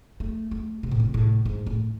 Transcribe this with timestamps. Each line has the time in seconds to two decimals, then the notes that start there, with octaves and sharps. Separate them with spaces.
0.20 A3
0.51 A3
0.83 C3
0.91 A2
1.00 C3
1.14 A2
1.45 G#2
1.66 A2